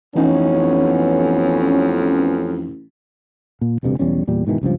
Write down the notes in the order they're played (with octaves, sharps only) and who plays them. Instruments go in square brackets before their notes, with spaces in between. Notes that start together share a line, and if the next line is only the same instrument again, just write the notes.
[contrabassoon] A1 [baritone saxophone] F2 [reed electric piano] E3 D#4 [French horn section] B3 C#4
[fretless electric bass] A#2
E1 D2 G2 C3
B1 E2 G3 C#4
E2 A#2 G3
G#2 B2 D#3 E3
F#1 C#2 G2 F3